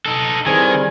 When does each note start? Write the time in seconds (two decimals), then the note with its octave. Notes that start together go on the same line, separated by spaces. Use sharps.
0.06 D#4 A4
0.46 D#3 E3 G3 C4 G#4 C5 G#5 G#6